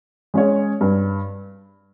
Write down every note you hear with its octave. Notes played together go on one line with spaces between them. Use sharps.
G#3 C#4 G#4 C#5
G2